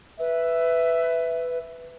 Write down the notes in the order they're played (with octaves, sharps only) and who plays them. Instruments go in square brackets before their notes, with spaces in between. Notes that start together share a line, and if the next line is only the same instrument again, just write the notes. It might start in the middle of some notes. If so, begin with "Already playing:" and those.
[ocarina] B4 [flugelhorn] E5